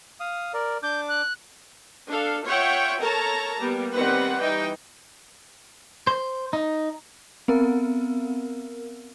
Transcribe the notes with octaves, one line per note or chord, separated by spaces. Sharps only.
F5 D#6
A#4 D5
D4 D6 G6
F#6
D4 A4 F5
F4 C#5 E5 F#5 G5
A4 A#4 C#5 A5 A#5
G3 A#3 B3
D#3 G3 B3 C4 B4 F#5
E3 D#4 G5
C5
D#4
B3 C4 A#4